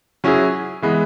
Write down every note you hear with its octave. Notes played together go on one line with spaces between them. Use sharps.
F#3 C#4 E4 G#4
E3 G#3 B3